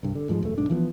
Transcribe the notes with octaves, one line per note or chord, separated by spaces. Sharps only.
C2 G2
D3
G#2 F3 G3 G#3
E1 F#2 A3
B1 G#2 D4
E3 F3 A3 B3